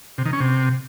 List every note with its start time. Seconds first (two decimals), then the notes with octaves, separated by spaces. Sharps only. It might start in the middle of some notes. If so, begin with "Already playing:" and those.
0.18 C3
0.26 D#3
0.33 C#4
0.40 C3